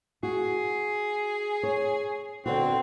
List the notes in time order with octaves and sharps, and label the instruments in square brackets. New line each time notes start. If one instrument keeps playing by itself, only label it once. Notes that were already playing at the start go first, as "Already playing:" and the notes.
[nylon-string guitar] F#4 [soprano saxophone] G#4
[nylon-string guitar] C#5
[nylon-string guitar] D3 B3 F#4 [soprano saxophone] C4